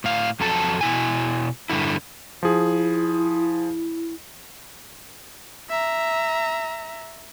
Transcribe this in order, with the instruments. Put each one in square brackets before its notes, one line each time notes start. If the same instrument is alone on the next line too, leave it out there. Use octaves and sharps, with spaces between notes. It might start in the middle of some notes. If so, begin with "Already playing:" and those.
[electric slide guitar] A2 F5
F2 F#3 A4 A5
B2 E4 G#5
G2 B2 D3 E4
[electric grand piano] F3 G#4 [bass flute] E4
[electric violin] E5 A#5